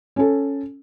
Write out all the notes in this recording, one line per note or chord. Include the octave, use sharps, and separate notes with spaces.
C#4 A4